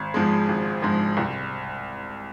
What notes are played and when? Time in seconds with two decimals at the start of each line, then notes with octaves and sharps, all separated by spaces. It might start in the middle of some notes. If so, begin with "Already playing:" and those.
Already playing: G#1
0.14 G#2 F3 G#3
0.48 G#1
0.82 G#2 F3 G#3
1.17 C2